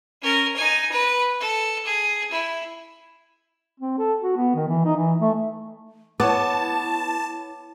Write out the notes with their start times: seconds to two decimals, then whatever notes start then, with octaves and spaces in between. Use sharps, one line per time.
0.22 C#4 A#4
0.56 D#4 G#5
0.92 B4
1.40 A4
1.85 G#4
2.31 E4
3.80 C4
3.98 A4
4.22 F#4
4.36 B3
4.56 D#3
4.68 E3
4.85 D#4
4.96 E3
5.21 A3
6.20 B3 E4 C#5 A5 D6